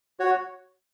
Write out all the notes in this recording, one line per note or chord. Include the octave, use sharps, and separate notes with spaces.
F#4 C#5